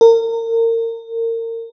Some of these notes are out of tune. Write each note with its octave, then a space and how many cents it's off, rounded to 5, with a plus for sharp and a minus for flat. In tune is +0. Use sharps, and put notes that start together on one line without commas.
A#4 -30